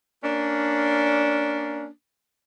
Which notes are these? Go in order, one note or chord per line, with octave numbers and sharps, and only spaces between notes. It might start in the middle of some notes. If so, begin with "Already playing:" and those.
A#3 C#4 D4